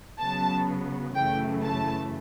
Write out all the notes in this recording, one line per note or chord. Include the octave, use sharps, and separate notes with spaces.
C#3 F#3 B3 A5
F#2 C#3 E3 A3 G5
A5